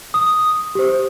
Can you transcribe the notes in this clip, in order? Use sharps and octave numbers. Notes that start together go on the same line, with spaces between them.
D#6
G4 C5